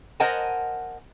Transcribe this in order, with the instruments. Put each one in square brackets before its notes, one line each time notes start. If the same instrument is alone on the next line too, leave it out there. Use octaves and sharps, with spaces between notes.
[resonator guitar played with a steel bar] A#4 C5 D#5 F#5 G#5 A5